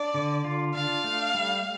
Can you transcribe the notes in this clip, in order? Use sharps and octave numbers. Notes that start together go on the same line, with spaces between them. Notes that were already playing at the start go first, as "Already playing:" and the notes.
Already playing: D4 D5
D3
F4
D4 F5
A3
G3